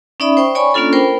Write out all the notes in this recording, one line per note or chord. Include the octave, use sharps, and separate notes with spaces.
C#4 D#4 D5 E5 B5 D#6
C5 G5 C#6
C#5 D5 G#5 B5 C#6
A#3 C#4 D4 F4 A4
A#4 C5 G5 B5